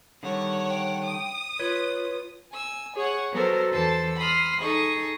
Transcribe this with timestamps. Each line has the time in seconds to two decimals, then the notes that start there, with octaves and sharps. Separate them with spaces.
0.23 D3 D#3 G3 C#5 F#5
0.69 G5
1.04 D#6
1.59 F4 B4 C#5
2.53 G#5 E6
2.95 G#4 C#5 F#5
3.32 F#3 B3 F#4 A4 A#4 C5
3.72 E2 E3 A4 C5 A5 E6
4.17 B5 C6 D#6 F6
4.62 D#4 G#4 A4 C#6 D#6